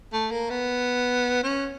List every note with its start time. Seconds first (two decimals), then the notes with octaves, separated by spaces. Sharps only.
0.13 A3
0.31 A#3
0.50 B3
1.43 C#4